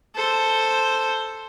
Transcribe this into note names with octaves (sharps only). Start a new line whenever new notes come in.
A4 C5